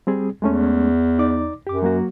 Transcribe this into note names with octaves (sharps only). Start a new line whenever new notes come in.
G3 C4 G#4
E2 G#3 A3 C#4
D#4 D5 D6
F#2 G4 D6
F#3 A#3 F#4